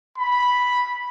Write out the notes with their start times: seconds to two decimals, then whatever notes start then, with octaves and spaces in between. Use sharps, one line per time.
0.17 B5